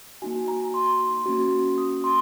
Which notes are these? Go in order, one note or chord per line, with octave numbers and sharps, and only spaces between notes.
A#3 D#4 F#4 G#5
A#5
C6
A#3 C#4 F#4
D#6
C6